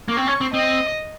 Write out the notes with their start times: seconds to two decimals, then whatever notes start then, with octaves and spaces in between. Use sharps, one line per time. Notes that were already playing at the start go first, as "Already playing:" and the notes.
0.08 A#3
0.13 C4 C#6
0.27 C#4
0.41 C4
0.54 C4 D#5